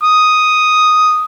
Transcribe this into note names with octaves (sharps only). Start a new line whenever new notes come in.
D#6